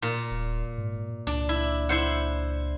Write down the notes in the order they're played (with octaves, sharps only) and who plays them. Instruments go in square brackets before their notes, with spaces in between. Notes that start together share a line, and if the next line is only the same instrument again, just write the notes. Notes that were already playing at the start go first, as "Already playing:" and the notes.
[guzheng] A#2
[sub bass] D#1
G#2
[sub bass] C#2 [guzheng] D4
[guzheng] E4
E4 C5 F#5